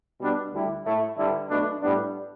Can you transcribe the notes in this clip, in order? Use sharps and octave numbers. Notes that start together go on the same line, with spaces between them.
B2 G3 B3 D4
D2 D3 G3 E4
A2 A3 E4
G2 D3 G3 E4
B1 B2 A3 D4
A2 G3 B3 D4